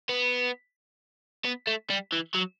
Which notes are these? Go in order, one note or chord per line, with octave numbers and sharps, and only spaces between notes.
B3
B3
A3
G3
E3
F#3